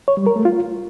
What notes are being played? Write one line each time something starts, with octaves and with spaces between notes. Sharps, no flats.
C#5
G3
A#4
A3
F4